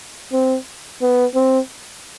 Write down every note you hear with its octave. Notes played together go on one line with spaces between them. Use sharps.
C4
B3
C4